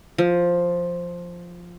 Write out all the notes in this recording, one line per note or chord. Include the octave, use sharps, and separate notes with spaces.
F3